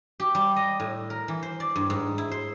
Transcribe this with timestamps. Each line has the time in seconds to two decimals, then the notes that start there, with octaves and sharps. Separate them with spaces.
0.20 G4
0.35 G3
0.56 D#5
0.80 A2
1.10 A#4
1.28 E3
1.43 C5
1.60 D5
1.76 G2
1.90 G#2
2.18 E4
2.31 C5